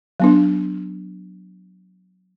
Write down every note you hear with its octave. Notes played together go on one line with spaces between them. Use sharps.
F#3 B3 D4